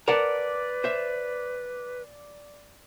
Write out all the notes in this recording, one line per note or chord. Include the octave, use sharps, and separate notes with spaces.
A#4 B4 D5 F#5 A5
C5 E5